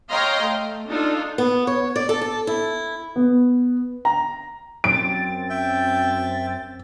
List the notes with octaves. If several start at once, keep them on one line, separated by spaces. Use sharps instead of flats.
C#5 D#5 F5 G5 A#5 C6
A3
D4 D#4 F4 A4
B3
C#5
D5
A4
A4
E4
B3
A#5
F#2 C4 A6 D7
E5 G5